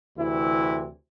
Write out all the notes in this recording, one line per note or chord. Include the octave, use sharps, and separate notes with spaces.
D2 C3 E3 E4